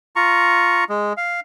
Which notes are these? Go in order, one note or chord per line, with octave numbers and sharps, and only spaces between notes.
F4 A#5 C#6
G#3
F5